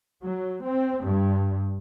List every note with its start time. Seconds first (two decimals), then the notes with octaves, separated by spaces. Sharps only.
0.23 F#3
0.64 C4
1.04 G2